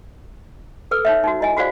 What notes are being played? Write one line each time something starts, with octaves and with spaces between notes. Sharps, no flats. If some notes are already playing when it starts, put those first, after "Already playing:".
A4 B4 E6
D#4 C#5 E5
D#4 F#4
E4 D#5 G#5
F4 F#4 G#4 C5 D5 F5